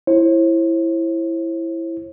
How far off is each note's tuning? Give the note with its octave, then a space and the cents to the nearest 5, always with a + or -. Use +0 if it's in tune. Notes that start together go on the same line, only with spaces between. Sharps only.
E4 +10 C5 +45